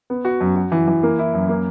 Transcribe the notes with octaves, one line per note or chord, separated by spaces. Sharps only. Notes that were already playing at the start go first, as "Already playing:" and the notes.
B3
F#4
F#2
F#4
E3
E3
A#3
E4
F#2
A#3